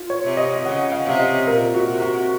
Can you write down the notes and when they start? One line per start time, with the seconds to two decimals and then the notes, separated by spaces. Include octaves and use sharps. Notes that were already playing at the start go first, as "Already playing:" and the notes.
Already playing: F4
0.10 C#5
0.24 C3
0.37 D#5
0.65 C#3 F#5
0.92 F5
1.05 C3
1.19 D#5
1.47 A#2 A#4
1.74 F#4
1.88 C3
2.02 F#4